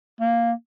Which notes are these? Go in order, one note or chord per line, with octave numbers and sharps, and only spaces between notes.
A#3